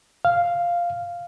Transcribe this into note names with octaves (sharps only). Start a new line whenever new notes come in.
F5